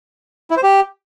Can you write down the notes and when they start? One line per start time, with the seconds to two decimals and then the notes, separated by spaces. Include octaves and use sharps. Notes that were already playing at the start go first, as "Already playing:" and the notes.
0.51 E4
0.57 C5
0.63 G4